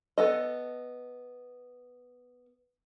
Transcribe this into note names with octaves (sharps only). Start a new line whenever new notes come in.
B3 A4 D#5